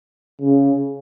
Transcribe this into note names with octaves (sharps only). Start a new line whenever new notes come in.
C#3